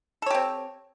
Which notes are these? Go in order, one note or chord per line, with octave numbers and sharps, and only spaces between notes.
C4 G4 A4 C#5